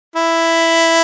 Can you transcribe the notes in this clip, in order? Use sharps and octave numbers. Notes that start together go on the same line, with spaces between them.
E4